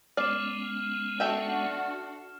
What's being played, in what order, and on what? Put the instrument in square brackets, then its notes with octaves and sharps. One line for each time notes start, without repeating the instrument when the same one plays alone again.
[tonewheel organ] G#3 B3 C#4 [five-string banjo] D5 [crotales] F6 C7 E7
[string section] D4 F#4 [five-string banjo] A4 E5 G5